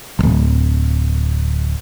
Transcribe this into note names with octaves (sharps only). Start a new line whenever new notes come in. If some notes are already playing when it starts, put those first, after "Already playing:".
D1 G#1